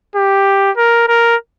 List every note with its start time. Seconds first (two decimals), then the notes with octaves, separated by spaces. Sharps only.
0.16 G4
0.77 A#4
1.08 A#4